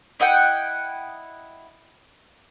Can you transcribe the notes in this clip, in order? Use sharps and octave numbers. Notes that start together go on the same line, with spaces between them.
E4 D#5 F#5 G5